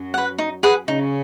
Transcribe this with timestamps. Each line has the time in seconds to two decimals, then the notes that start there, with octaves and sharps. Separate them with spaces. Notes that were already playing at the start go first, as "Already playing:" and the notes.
Already playing: F#2 F#3
0.14 B4 F#5
0.38 D#4
0.63 G#4 B4 F#5
0.88 C#3 C#4 D#4